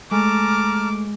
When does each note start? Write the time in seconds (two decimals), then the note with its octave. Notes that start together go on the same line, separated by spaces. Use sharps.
0.11 G#3 A3 A5 A#5 D6 F6